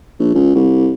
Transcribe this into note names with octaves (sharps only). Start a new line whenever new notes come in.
A#1
C#2
C2